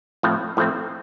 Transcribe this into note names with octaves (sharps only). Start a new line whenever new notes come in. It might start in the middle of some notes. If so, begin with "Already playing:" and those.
A2 F3 A3 C4
A2 F3 A3 C4